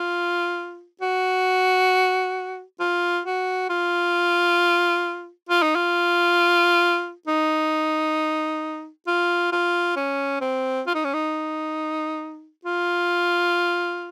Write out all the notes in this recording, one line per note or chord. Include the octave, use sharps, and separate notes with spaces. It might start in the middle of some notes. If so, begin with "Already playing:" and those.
Already playing: F4
F#4
F4
F#4
F4
F4
D#4
F4
D#4
F4
F4
C#4
C4
F4
D#4
C#4
D#4
F4